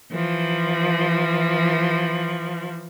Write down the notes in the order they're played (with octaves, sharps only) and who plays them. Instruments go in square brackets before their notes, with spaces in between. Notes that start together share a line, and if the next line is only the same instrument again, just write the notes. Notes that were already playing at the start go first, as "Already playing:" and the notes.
[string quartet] E3 F3